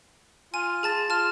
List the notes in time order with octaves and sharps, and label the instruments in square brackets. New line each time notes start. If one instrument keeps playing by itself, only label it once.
[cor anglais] F4 [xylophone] G#5 D#7
[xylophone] G#4 A5 A6
[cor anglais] F4 [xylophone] A5 F6